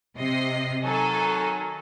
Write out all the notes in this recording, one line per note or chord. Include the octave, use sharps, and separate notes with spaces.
C3 D#5 C7
D#3 F#3 A4 G#5